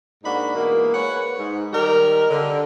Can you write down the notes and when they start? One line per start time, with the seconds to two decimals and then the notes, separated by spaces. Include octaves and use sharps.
0.24 G#2 A#3 D4 D#4 F#4 B5
0.55 B2 E3 G#3 A#3
0.93 G#4 A#4 B4 C#5 F#5
1.37 G#2
1.73 D#3 G3 D#4 G4 A#4
2.30 D3